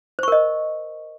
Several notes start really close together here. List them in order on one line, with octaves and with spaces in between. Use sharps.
C5 C#6 A#4 D#5